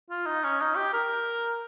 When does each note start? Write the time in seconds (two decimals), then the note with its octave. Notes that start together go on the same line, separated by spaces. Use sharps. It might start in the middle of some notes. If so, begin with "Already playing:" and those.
0.10 F4
0.26 D#4
0.44 C#4
0.61 D#4
0.77 G4
0.93 A#4